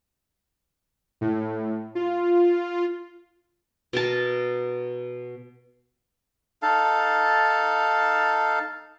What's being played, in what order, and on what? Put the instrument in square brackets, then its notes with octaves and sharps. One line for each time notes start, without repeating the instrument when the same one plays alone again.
[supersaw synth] A2
F4
[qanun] B2 A#4 A5
[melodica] D#4 A4 F5 A5